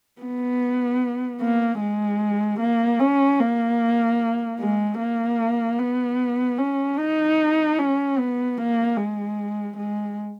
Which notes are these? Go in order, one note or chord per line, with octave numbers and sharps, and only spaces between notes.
B3
A#3
G#3
A#3
C#4
A#3
G#3
A#3
B3
C#4
D#4
C#4
B3
A#3
G#3
G#3